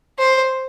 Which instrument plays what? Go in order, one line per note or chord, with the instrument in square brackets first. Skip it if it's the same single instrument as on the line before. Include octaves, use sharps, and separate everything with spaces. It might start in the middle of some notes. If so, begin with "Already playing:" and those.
[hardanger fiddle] C5